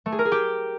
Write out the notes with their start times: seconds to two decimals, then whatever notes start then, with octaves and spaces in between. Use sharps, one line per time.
0.06 A3
0.12 G#4
0.19 A#4
0.25 G#4
0.32 G4